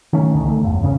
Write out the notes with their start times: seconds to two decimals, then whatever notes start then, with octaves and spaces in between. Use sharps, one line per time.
0.13 D#3 A3 C#4
0.34 C2 D3 D#3
0.48 A3
0.63 G#1 E2 G2
0.82 G#1 C#3 C4 C#4